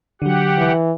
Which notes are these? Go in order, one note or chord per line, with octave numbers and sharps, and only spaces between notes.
D3 F#3 G4 F#5
E3